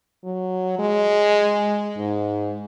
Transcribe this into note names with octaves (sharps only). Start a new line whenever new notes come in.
F#3
G#3
G#2